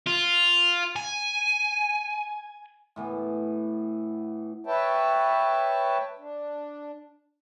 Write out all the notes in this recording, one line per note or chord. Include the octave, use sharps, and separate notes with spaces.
F4
G#5
A2 E3 B3
B4 C#5 E5 G5 A5
D4